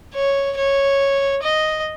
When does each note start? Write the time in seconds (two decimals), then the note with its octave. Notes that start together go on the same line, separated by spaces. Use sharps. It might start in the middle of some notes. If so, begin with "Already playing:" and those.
0.15 C#5
0.57 C#5
1.43 D#5